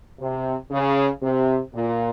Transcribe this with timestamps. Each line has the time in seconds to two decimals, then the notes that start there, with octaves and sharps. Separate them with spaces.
0.20 C3
0.72 C#3
1.23 C3
1.74 A#2